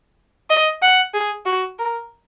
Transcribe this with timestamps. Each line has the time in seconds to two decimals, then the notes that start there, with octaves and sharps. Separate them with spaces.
0.50 D#5
0.82 F#5
1.14 G#4
1.46 F#4
1.79 A#4